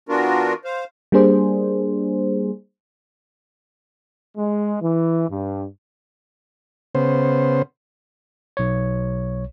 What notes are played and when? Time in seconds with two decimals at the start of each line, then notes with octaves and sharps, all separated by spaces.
0.09 E3 B3 D4 F4 F#4 A#4
0.65 C5 F5
1.12 G3 A#3 D4 G#4 C5
4.37 G#3
4.81 E3
5.29 G2
6.95 C#3 B3 C5
8.57 B1 C#5